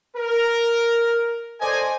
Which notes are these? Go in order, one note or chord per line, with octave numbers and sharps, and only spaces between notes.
A#4
A4 C5 D5 D#5 G#5